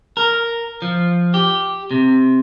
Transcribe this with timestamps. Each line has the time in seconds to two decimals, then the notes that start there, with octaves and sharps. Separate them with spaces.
0.17 A#4
0.82 F3
1.34 G4
1.91 C3